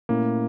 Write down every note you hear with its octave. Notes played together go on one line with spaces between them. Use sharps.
A#2 A3 A#3 C#4 E4